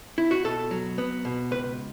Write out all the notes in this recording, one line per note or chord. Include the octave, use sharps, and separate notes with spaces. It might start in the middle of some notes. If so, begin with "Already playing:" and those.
E4
F#4
B2 A4
F#3
B3
B2
C#2 B4